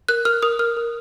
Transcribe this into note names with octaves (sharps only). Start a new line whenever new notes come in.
A#4 F#6
A#4 F6
A#4 D#6
A#4 F6
A#4